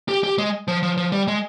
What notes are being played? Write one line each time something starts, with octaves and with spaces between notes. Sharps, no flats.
G4
G4
G#3
F3
F3
F3
G3
G#3